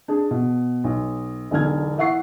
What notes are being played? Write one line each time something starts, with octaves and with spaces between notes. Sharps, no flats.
D4 G#4
B2
B1
E1 B1 D3 D4 F6 G#6
E3 E5 F#5 C#6 C7